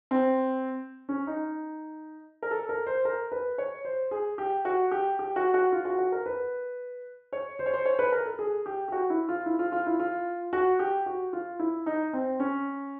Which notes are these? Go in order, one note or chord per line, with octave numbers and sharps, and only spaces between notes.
C4
C#4
D#4
A#4
A4
A#4
C5
A#4
B4
C#5
C5
G#4
G4
F#4
G4
G4
F#4
F#4
F4
F#4
F#4
A#4
B4
C#5
C5
C#5
C5
C#5
B4
A#4
A4
G#4
G4
G4
F#4
E4
F4
E4
F4
F4
E4
F4
F#4
G4
F#4
F4
E4
D#4
C4
C#4